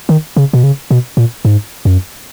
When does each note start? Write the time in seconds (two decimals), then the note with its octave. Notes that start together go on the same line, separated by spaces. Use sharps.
0.09 D#3
0.36 C#3
0.53 B2
0.63 C#3
0.91 B2
1.17 A#2
1.45 G#2
1.85 F#2